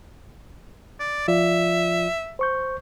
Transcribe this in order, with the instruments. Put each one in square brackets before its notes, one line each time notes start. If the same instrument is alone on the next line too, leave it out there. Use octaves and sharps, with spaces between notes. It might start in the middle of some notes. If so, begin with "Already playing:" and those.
[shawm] D5
[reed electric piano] F3 F4 D5 [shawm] E5
[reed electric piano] C5 C#6 G6